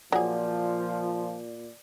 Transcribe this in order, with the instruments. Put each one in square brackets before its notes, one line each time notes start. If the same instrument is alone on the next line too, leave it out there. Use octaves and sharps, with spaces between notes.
[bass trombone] A#2 [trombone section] F3 [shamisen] F#3 G#4 [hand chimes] D5